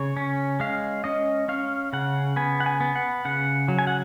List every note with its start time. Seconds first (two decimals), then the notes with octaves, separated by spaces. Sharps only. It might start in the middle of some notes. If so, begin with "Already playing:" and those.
Already playing: C#3 C#5
0.17 C#4
0.60 G#3 F5
1.04 C#4 D#5
1.49 C#4 F5
1.93 C#3 F#5
2.36 B3 G#5
2.60 F#5
2.66 G#5
2.80 B3
2.96 F#5
3.25 C#3 F#5
3.68 F#3
3.79 G#5
3.87 F#5